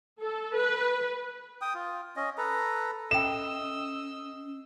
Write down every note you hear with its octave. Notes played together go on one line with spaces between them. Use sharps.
A4
B4
G5 D#6
F4
C#4 D#5
A4 B4 A#5
C#4 A4 D#5 E5 G5 E6 E7